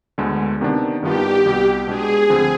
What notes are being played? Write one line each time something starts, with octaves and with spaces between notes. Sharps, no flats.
D2 D3 G#3 B3
C3 D#3 B3 D4
G2 D#3 B3 D4 F4 G4
C2 B2 B3
B2 G#3 D4 G4 G#4
D2 D3 F3 C4